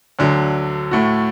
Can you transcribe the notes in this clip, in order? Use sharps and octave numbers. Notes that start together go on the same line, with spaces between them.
D2 D3 F#3
A2 A3 F#4